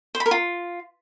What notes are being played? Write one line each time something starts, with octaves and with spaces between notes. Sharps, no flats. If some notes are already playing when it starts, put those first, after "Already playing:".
C5
B5
A#4
F4